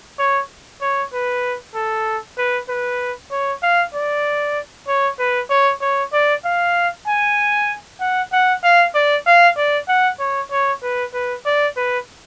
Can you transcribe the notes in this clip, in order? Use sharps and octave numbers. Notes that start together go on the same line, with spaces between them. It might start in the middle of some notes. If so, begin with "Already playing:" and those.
C#5
C#5
B4
A4
B4
B4
C#5
F5
D5
C#5
B4
C#5
C#5
D5
F5
G#5
F#5
F#5
F5
D5
F5
D5
F#5
C#5
C#5
B4
B4
D5
B4